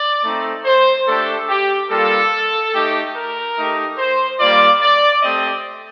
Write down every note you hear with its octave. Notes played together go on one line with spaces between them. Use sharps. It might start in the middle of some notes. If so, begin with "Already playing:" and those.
Already playing: D5
A3 C4 D#4
C5
A3 D4 G4 A4
G4
G3 A#3 F4 A4
A3 D#4 G4
A#4
A3 D#4 G4
C5
G3 A#3 F4 D5
D5
A3 C4 G4 D#5